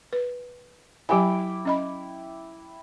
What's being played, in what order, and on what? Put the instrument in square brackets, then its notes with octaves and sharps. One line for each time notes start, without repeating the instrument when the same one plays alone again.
[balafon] B4
[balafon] F#3 G4 G#5 [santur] E4 G5 D6
[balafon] C#4 D#5 B5